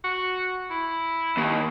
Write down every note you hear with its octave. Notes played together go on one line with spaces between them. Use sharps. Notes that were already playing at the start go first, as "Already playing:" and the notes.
F#4
E4
D#2